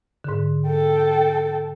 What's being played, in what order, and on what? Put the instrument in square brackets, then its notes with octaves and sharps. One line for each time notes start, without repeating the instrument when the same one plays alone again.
[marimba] G#2 D3
[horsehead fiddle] A4 G5